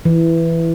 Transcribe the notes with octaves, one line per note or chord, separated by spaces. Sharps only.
E3